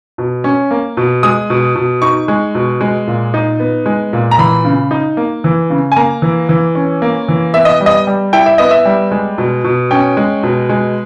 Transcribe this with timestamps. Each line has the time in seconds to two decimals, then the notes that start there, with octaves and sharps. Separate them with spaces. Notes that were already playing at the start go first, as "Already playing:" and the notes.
0.18 B2
0.44 C#4
0.71 A#3
0.97 B2
1.23 G#3 D#6
1.50 B2
1.75 B2
2.02 D#4 C#6
2.28 G#3
2.55 B2
2.81 G#3
3.07 A#2
3.34 D#4
3.60 B3
3.86 G#3
4.13 A#2
4.31 A#5
4.38 E3 B5
4.65 C#3
4.91 D#4
5.17 A#3
5.44 E3
5.70 C#3
5.92 G#5
5.97 A#3 A#5
6.22 E3
6.49 E3
6.75 C#4
7.02 A#3
7.28 E3
7.54 B3 E5
7.65 D#5
7.81 G3
7.86 D#5
8.07 G3
8.33 E4 G5
8.46 E5
8.58 B3 D#5
8.71 E5
8.85 G3
9.12 G#3
9.38 B2
9.64 B2
9.91 C#4 G5
10.17 G#3
10.43 B2
10.69 G#3